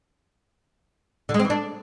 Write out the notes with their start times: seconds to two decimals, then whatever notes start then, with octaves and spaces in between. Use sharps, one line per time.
1.29 D3
1.34 G#3
1.39 C4
1.45 E3
1.50 D4